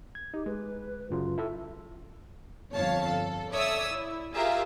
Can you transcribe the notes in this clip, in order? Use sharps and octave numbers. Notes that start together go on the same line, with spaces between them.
G#6
D#4 G4
G#3 B4
F#2 C#3 F#3 F4
E4 A4 E5
G1 F2 C#5 F5 A5
A4
A4 C#5 D5 E5 D#6 E6
E4
F4 G4 G#4 A#4 E5 F5